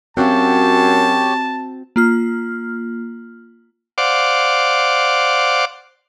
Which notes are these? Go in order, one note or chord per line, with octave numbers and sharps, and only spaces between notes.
F#2 C4 F#4 G4 C#5 F5 A5
A#3 F4 F6
C5 D5 F5 F#5 D6